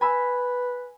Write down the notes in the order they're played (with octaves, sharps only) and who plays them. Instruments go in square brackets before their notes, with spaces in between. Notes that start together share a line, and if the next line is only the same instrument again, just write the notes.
[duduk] B4 [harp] G#5 B5 E6